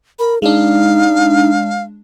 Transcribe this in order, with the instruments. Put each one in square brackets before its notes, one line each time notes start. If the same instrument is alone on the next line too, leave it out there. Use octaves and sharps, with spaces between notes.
[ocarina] A#4 [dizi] B5
[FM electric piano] G#3 D4 [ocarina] D#4 [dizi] F5